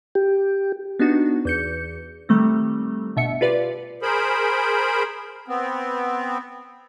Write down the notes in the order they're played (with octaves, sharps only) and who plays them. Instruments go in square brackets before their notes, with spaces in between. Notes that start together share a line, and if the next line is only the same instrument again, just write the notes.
[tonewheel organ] G4
[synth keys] B3 D4 D#4 F#4
E2 G6 C#7
D#3 G3 A3 C4
G1 B2 E5 C#7
F4 G4 B4 D5
[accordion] G#4 A#4 C5 B5
B3 C4